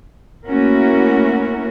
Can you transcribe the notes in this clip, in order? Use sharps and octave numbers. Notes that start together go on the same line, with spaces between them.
A3 A#3 C#4 E4 F#4 A#4